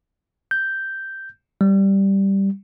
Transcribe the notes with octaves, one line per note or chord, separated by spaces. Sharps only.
G6
G3